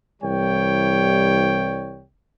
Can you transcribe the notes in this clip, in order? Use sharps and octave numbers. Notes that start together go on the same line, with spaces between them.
C2 E3 G3 C#5 G5